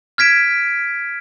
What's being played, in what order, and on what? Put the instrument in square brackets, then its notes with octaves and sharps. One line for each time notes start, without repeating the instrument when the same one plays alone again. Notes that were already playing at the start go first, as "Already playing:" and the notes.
[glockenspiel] F6 G#6 B6 D7 E7